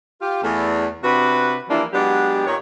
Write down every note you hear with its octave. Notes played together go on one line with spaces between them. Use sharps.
F4 G4
E2 A3
C3 D4 F#4 B4
E3 F3 G3 A#3 D4 E4
F#3 G#3 B3 D4 G4
A#2 D#3 C#5